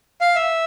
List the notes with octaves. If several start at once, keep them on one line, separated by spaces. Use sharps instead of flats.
F5
E5